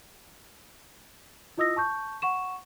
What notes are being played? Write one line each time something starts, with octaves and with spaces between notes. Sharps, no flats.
E4 F4 D#5 D#6 E6 A#6
A5 C#6 G6
F#5 C#6 E7